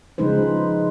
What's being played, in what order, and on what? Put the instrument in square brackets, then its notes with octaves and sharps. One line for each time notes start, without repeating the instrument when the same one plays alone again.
[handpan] C#3 F3 G#3 D#4 B4 C5